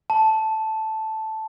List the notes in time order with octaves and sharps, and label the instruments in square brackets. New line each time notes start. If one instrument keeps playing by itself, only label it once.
[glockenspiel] A5